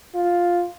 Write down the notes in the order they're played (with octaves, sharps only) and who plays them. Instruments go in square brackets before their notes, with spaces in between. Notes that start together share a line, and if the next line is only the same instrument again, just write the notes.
[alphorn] F4